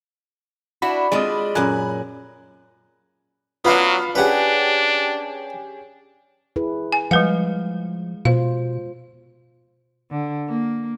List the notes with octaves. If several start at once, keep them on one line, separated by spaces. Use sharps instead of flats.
D4 E4 F#4 B5
G#3 C4 D4 F4 D5 D#5 D#6
F#2 A#2 G#5 A#5 F#6
F#3 B3 C#4 D4 F4 B4 F5
C#4 D4 G4 G#4 B4 F#5
E4 G#4 B4
G#5
F3 G3 G#3 B4 F5 F#5
B2 F4 C5 F5
D3
A#3